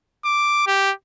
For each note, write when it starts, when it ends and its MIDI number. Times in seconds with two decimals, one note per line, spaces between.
0.25 0.66 86
0.67 0.92 67